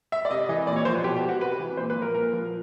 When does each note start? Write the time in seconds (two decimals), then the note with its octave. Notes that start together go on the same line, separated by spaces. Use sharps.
0.12 E5
0.25 D5
0.30 C3 D#5
0.49 E3 D#5
0.67 A#2 D5
0.76 C#5
0.85 F3 C5
0.95 B4
1.03 B2 G4
1.17 G4
1.29 F#4
1.41 C3 B4
1.59 E3
1.77 A#2 C5
1.90 B4
1.96 F3
2.02 A#4
2.14 A#2 A#4
2.33 F3